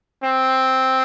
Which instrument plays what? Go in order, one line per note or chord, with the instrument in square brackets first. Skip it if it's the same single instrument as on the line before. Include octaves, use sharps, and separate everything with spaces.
[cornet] C4